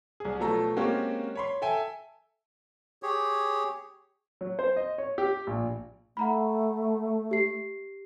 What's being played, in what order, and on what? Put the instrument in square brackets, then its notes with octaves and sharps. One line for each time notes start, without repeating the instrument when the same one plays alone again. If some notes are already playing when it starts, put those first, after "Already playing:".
[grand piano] C2 G#4
B2 F3 F#3 A3 A4 A#5
G#3 A#3 C4 C#4 F#4 G4
C#5 B5 C6
A4 E5 G5 G#5
[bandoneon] G4 G#4 C#5
[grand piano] F#3
C5
D#5
C#5
G4
A#1
[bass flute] A3 [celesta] F#5 A#5 B5
[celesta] G4 C7